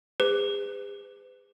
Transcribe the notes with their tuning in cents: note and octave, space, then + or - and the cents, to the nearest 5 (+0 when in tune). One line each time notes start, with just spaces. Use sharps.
G#4 -40 B4 +45